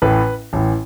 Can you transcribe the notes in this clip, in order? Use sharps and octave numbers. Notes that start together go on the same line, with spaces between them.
A1 A2 E3 B4
A1 A2 E3